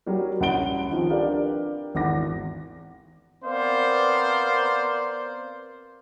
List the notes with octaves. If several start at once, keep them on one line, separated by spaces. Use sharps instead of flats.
F#3 G3 A#4
C2 C#4 F#5 C6 D7 G7
D#3 F3 C4
D4 G4 A#4 B4 D5 F5
G#1 E2 D6 A#6
B3 C4 A#4 C5 D5 F5